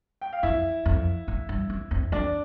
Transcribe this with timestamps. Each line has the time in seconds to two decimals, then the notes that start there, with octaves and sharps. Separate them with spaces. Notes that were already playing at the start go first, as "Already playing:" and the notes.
0.21 G5
0.33 F5
0.43 F2 E4 E5
0.85 F2
1.28 A2
1.49 G2
1.70 F2
1.91 F2
2.12 F2 D4 D5